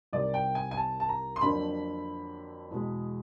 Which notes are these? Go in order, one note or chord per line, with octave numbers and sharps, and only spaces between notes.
C2 C3 D#3 G3 D5
G5
G#5
G#5
A5
A5
A#5
C6
F2 D3 F#3 A#3 B5
E2 B2 G#3